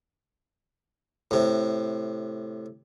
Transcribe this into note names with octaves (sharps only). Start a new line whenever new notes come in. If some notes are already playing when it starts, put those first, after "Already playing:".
A2 C3